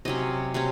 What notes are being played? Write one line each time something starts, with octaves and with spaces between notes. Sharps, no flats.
C3 F#3 C#4 D#5
C3 F#3 C#4